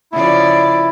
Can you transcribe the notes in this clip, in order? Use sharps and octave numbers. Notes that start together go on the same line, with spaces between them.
C#3 F3 E4 D5